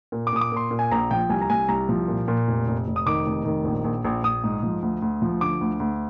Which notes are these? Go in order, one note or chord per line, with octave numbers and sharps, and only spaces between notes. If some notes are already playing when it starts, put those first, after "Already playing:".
A#2
D6
A#2 D#6
D6
A#2 C6
A#2
G#5
A#1 A#5
F3 G5
C2 G#5
A#5
C2 G#5
C2 A#5
F3
A#2
A#2
F1
F1
F1
D#6
D#3 D6
F1
D#3
A#1
A#1
A#1
A#1 D#6
G#2
F3
D2
D2
F3
D3 D6
D2
D2